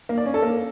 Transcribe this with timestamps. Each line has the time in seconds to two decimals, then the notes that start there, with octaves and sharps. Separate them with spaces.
0.09 A#3
0.18 D5
0.26 C#4
0.34 A4
0.42 A#3